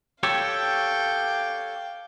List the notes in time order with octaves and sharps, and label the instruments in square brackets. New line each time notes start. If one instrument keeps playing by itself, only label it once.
[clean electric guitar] G4 A4 C#5 [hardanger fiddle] F5 G5